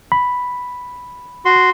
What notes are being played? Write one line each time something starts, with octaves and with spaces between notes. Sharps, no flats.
B5
F#4 C6